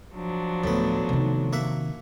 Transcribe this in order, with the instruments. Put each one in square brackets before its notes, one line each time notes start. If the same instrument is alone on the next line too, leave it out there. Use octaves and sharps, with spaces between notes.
[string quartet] F3 F#3 D4
[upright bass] D1 A1 [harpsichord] A2 B3
[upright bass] C3 D#3
[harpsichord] A#3 E5 F#5